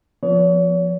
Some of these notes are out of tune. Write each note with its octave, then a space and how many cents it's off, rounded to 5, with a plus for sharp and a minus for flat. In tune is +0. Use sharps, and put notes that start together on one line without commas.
F3 +0 B3 +0 C#5 +40